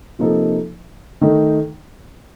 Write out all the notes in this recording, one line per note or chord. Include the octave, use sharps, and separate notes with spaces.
C3 F3 A#3 D#4 A4
D#3 A3 D#4 A4